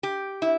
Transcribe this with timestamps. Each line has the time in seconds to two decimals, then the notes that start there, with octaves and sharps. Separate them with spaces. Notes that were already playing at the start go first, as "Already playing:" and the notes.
0.03 G4
0.42 E4